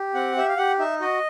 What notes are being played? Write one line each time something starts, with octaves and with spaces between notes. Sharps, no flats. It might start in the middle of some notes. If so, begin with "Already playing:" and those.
Already playing: G4
C4 F#5
G4 E5
F5
G4 F#5
D#4 E5
F#4 D#5